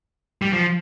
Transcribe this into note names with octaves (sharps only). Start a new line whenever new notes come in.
G3
F3